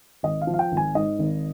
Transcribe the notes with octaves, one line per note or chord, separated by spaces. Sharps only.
G#1 D#5
F5
F3
F5
G5
G#1
G#5
G#2 D#5
G#1